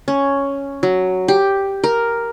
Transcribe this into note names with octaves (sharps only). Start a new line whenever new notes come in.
C#4
F#3
G4
A#4